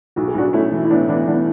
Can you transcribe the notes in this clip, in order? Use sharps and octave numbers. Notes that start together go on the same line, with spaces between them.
B1 F#4
G#4
B1 D4 F#4
A3 C#4 E4
E3
E4
A2 B3 D4
E3 B3 D4
E3 B3 D4